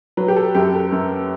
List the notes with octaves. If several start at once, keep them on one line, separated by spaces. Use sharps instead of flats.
F#3 B4
G4
A4
F#2 G4
A4
F#2